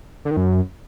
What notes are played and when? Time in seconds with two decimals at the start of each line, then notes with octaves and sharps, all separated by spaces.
0.25 D3
0.31 D#3
0.37 F#2